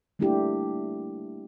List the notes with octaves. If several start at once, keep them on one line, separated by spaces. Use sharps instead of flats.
G3 A3 A#3 D4 E4 G4